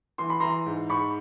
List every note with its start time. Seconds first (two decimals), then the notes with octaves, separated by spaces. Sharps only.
0.18 E3 C6
0.30 B5
0.40 E3 A#5 C6
0.66 G#2
0.89 G#2 B5 C#6